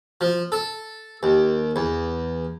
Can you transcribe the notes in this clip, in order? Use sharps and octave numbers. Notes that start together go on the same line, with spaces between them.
F3
A4
D#2
E2